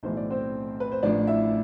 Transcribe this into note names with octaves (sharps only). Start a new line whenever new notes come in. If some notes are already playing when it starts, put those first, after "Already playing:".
B1 A2 E3 C5
D5
C4 C5
B4
C5
A1 A2 F3 D4 D5
E4 E5